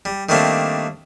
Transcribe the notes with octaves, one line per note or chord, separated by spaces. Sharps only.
G3
D#3 G3 A3 A#3 C4 D4